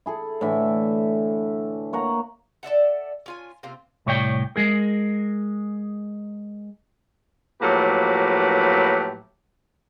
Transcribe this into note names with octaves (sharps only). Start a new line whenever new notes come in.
E4 G#4 A4
A2 D3 E3 E5
A#3 C#5 F#5 A#5
A4 D5 E5 F#5
C#4 F4 G#5
C3 A#3 C4 F4
C2 A2 C#5 D5 F#5 G5
G#3 G#4 A#4
A2 F3 F#3 A#3 G4 B4